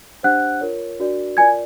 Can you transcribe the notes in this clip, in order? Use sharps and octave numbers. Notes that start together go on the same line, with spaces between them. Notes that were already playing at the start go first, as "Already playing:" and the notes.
D4 G4 C5 F#5 F#6
F4 A#4 C#5
D4 F#4 A#4 D5
F4 A#4 D5 G#5 G#6